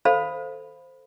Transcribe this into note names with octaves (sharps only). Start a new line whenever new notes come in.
A4 C5 F5 B5